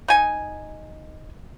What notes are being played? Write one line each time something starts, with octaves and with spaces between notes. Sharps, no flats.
D#4 G#5